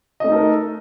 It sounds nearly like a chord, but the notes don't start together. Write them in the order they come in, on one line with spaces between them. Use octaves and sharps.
D#5 A3 D#4 A4 A#4